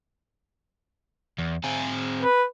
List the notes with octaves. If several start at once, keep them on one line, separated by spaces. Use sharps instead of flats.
E2
C4 G#4
B4